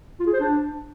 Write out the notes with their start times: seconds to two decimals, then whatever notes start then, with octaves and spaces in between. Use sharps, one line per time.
0.20 F4
0.26 G#4
0.33 C5
0.40 D4